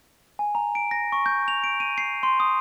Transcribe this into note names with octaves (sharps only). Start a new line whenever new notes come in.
G#5
A#5
D7
A#6
C#6
G6
F7
D7
D#7
C7
C6
D#6